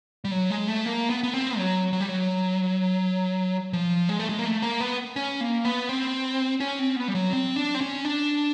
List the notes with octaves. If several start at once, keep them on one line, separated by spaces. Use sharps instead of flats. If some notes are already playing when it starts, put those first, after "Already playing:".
G3
F#3
G#3
A3
A#3
B3
B3
C4
F#3
F#3
G3
F#3
F3
G#3
A3
G#3
A#3
A3
A#3
B3
C#4
A#3
B3
C4
C#4
C4
B3
G3
F#3
C4
D4
C4
C#4
D4